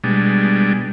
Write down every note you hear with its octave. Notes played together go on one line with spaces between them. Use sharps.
B2 G3 G#3 D4